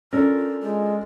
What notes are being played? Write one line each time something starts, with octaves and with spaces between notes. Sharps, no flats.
C#4 D4 F4 A4 A#4
G#3 F4